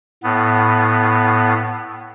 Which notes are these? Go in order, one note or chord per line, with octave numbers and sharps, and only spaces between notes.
A2 B3